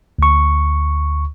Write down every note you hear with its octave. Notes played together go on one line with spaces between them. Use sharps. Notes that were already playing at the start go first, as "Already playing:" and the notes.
D2 C#6